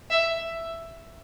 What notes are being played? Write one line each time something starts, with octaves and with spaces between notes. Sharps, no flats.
E5